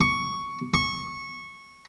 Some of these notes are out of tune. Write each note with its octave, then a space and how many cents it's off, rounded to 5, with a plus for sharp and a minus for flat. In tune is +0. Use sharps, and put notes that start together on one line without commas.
C#6 +5
C#6 -15